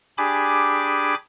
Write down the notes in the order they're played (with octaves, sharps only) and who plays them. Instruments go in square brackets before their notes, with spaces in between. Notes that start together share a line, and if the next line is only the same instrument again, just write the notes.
[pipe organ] D4 G4 G#4 G#5 B5 D6